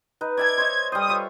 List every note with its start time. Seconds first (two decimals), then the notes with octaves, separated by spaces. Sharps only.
0.21 D#4 B4
0.37 D5 E5 A5 G#6
0.58 C5 C#5 D#5
0.92 G3 A4 C5 D#6
1.08 F4 C#5 E5